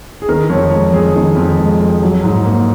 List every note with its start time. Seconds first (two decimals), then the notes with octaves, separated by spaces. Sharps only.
0.22 G#4
0.29 D#3 A#4
0.50 F2 C#5
0.71 G#3 C#5
0.93 F2 G#4
1.16 D#3
1.37 F2
1.59 G#3
1.80 F2
2.02 F#3
2.24 G#2
2.45 A#3